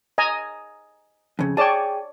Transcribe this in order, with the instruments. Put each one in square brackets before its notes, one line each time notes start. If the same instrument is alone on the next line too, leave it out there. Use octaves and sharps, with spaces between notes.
[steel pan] D#5 G#5 A#5
[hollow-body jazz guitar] F2 C#3
[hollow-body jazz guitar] G#4 G5 [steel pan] C#5 D5 A5